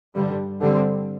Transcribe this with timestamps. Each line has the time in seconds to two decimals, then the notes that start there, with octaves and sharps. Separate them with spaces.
0.15 G2 D3 G3
0.60 D3 G3 C4